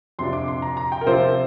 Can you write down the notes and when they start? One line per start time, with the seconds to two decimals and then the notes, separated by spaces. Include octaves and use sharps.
0.19 F2 C3 F3 D4 C6
0.33 D6
0.48 C6
0.62 A#5
0.77 A#5
0.92 G5
1.01 A#4
1.06 C3 F3 C4 F4 C5